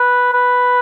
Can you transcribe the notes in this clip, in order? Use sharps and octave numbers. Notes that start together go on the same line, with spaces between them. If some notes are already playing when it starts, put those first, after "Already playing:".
Already playing: B4
B4